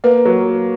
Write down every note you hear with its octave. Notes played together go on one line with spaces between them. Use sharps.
A#3 B4
F#3